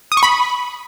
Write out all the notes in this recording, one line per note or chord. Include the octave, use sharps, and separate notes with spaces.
D#6
C#6
B5